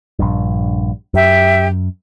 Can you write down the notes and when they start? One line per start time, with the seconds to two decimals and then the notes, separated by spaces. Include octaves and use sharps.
0.19 A#1 G2
1.14 F#2 G4 E5